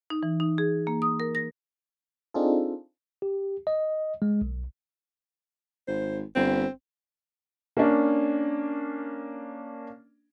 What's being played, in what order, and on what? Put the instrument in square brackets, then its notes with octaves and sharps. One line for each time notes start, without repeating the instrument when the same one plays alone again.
[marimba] D#4
E3
D#4
G#4
A#3
D#6
A#4
A#6
[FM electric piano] C4 D4 D#4 F4 G#4 A4
[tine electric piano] G4
D#5
G#3
B1
[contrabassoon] G#1 [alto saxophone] C5
[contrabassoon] G1 [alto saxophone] C4
[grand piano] A#3 C#4 D4